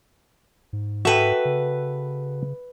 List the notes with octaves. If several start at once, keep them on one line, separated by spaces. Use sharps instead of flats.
G#2
F#4 A4 B4 E5 G5
C#3